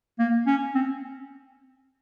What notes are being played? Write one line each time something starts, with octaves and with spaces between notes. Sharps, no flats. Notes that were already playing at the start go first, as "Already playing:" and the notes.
A#3
C#4
C4